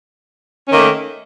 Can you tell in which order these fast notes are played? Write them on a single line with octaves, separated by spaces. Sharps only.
C#4 D#3 A#3 A3